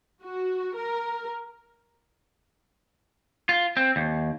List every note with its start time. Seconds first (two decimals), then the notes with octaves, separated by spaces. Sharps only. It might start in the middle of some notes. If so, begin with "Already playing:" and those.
0.23 F#4
0.76 A#4
3.49 F4
3.77 C4
3.96 D#2